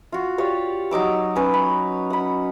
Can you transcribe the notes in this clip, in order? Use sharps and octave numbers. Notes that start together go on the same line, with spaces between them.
F4 F#4
F4 G4 C#5 D5
F#3 D#4 D6 E6
C#4 B4 F#5
B5
F#5 B5